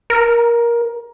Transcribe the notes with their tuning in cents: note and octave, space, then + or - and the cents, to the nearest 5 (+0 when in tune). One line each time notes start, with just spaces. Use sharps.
A#4 +15